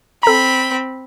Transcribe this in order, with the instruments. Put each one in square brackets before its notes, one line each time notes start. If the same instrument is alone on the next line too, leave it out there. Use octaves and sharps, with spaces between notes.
[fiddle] C4 B5 [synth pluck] A4 A#5